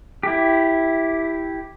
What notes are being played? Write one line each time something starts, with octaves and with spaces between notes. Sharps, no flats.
E4 G4